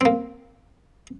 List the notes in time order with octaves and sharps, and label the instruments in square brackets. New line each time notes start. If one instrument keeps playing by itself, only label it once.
[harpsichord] A#3 C4